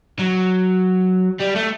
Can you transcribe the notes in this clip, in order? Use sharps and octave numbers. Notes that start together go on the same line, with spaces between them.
F#3
G3
A3